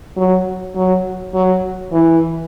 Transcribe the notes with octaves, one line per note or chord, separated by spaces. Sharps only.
F#3
F#3
F#3
E3